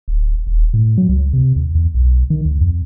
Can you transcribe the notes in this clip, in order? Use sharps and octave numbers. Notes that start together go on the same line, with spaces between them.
D1
D#1
A2
F#3
C#2
C3
D#2
E2
B1
D#3
D2
F2